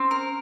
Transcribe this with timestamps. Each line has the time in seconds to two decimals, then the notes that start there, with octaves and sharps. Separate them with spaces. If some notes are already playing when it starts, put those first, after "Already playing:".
Already playing: C4 C#4
0.11 A#4